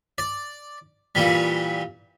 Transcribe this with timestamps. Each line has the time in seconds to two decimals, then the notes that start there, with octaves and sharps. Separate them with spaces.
0.18 D5
1.15 A#2 E3 G3